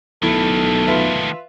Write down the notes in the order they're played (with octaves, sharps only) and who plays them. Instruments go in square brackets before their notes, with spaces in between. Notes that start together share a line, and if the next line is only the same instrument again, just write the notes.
[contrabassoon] B1 [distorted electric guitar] D#3 A3 [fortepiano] E4 [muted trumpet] A4
[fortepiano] F4 B4 E5